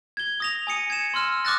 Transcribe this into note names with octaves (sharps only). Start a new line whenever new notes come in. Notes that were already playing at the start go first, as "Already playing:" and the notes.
G#6 G7
D#6 A#6 F7
G#5 D#6 C#7 D#7
G#6 C#7 E7
C6 E6 F6 E7
D6 D#6 F6 F#6 A6 A#6